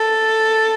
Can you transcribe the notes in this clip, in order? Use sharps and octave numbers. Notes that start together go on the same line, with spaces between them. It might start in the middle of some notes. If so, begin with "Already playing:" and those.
Already playing: A4